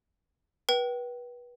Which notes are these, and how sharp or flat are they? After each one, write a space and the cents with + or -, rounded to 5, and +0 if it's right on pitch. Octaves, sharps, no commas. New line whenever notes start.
B4 -25 G5 -30